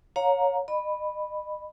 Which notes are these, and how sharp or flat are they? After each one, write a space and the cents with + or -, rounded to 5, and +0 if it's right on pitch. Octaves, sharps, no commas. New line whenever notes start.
C#5 +0 F5 +35 A#5 +0
D#5 -35 B5 +0